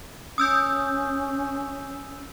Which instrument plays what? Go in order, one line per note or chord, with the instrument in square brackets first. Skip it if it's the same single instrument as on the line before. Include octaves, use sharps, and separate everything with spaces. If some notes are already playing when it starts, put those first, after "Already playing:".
[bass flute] C#4 [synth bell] D#6 E6 G6